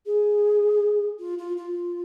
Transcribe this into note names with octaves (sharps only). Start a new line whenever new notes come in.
G#4
F4
F4
F4